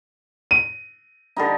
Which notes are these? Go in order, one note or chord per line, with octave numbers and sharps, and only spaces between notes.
D#7
D3 G3 D#4